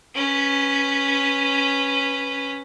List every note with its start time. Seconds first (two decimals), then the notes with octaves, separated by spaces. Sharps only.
0.15 C#4 B4